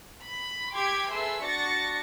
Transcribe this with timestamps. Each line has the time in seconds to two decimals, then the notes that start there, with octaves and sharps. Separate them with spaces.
0.23 B5
0.73 G4 C6 D6 G#6 B6
1.12 G#4 A4 B4 E5 C6 E6
1.43 D4 F#4 C#6 A6 A#6 C#7